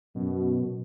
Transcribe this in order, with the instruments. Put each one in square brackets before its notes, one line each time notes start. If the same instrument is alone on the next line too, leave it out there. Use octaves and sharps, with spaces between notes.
[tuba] F#2 [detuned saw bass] B2